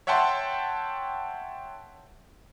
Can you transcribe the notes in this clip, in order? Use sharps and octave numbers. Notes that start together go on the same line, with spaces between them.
C#5 E5 F#5 G5 A5 C6